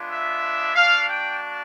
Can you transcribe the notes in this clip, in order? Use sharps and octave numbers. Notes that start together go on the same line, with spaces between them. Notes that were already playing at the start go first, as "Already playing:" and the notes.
Already playing: G#3 B3 D4 F4
E5
A#3 D4 F#4 F5
G5